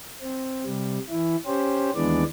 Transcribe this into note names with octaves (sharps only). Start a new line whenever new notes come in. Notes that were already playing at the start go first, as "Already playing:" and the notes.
C4
C3 G3
E3 E4
C#4 G4 C5
D#2 E3 G#3 B3 D4 D5